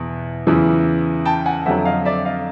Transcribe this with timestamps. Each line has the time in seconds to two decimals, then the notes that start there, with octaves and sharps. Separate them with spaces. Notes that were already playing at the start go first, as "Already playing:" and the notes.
Already playing: E2 B2
0.47 E2 C#3 E3
1.25 G5 A5
1.46 F#5 G#5
1.66 F2 D3 F#3 E5 F#5
1.85 D#5 F5
2.05 D5 E5
2.25 D#5 F5